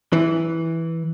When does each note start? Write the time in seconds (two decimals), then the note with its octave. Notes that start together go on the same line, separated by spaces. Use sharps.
0.13 E3